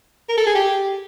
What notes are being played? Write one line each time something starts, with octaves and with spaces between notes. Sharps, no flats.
A#4
A4
G#4
G4